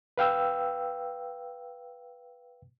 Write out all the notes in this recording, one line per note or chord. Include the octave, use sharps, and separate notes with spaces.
B4 F5 G5 E6